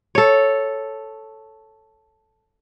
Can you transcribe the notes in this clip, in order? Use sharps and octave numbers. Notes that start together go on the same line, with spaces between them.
A4 C#5